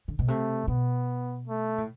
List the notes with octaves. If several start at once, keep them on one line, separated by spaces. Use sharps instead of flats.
D3
B2
C3 A3
B2 B3
A3
A2